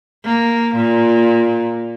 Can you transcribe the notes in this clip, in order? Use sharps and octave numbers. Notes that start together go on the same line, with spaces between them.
A#3
A#2